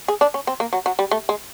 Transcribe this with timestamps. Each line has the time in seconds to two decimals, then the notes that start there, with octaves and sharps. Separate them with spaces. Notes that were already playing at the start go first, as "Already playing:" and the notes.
0.08 G#4
0.21 D4
0.34 C#4
0.47 C4
0.60 A#3
0.73 F#3
0.86 F#3
0.99 G3
1.11 A3
1.29 G#3